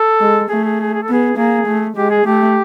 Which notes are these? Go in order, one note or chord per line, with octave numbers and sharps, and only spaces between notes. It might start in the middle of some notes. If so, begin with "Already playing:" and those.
Already playing: A4
G#3
A3 G#4
G#4
G#4
G#4
A4
B3 G#4
A#3 G#4
A3
G#3 G4
G#4
A3 G4